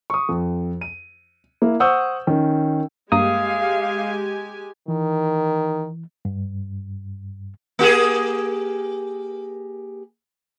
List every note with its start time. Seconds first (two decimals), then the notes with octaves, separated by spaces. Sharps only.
0.10 C#6 D#6
0.29 F2
0.81 D#7
1.62 A#3 E4
1.80 C5 F#5 C#6 D#6 E6 G6
2.27 D#3 C#4
3.12 G2 G#3 A#3 G4 F5 G#5 D#6
4.88 D#3 E3
6.25 G2
7.79 A#3 G4 G#4